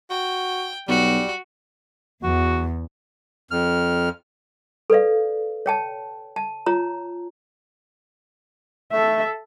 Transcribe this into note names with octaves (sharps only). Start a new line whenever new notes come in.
F#4 G5
B1 G3 F#4
E2 F#4
F2 F6
A4 B4 D5 F5
C#5 G5 A5
A5
F4 C#5 A#5
A3 A4 E5